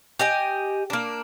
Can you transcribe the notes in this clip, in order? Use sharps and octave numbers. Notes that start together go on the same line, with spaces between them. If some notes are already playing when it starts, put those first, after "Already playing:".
G4 D#5 G#5
A#3 D4